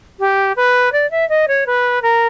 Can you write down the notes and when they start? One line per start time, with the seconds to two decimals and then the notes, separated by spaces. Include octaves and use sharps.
0.19 G4
0.56 B4
0.92 D5
1.11 E5
1.29 D#5
1.48 C#5
1.66 B4
2.02 A#4